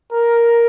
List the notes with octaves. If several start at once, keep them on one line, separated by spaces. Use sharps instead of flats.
A#4